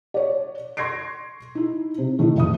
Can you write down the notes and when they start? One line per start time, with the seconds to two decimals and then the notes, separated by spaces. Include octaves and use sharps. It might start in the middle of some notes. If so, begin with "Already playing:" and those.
0.14 C#5 D5
0.77 C6 C#6 G#6 A#6 C7 D7
1.55 D#4 E4
1.98 C3
2.19 A2 D#3 A3
2.36 F1 E5 D#6